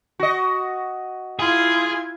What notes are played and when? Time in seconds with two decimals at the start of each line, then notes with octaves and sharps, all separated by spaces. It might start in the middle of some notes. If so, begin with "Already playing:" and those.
0.20 F#4 D#5
1.39 E4 F4 G#4 G#6